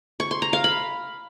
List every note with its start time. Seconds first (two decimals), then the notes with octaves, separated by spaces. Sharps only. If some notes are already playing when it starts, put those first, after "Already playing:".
0.20 C#6
0.31 C6
0.42 A#5
0.53 F5
0.64 B5